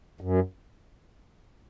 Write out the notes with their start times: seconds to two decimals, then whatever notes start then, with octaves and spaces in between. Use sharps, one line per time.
0.21 F#2